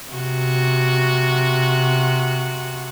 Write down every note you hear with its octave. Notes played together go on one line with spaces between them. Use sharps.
C3 F#4